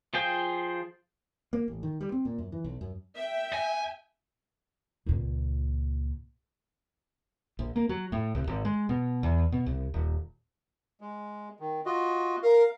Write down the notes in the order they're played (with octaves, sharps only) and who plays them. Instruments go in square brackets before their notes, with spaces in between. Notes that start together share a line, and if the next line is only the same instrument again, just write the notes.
[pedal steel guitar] F3 F4 G#4 G5
[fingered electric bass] A#3
A1
D#3
G3
C4
A#2
F#2
E3
B1
F#2
[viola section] E5 G5
[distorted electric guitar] G#5
[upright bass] C#2 A#2
[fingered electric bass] A#1
A#3
F#3
A2
C2
G#1
G#3
B2
E2
B2
C2
D#1
[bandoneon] G#3
D#3
F4 F#4 D#5
[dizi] A#4 [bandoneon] F5